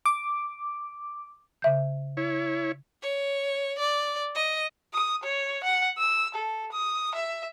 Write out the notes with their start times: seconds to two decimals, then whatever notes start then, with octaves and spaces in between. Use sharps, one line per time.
0.06 D6
1.62 C#3 E5 G6
2.17 E4 C#5
3.02 C#5
3.79 D5
4.36 D#5
4.94 D#6
5.23 C#5
5.63 F#5
5.98 E6
6.34 A4
6.72 D#6
7.15 E5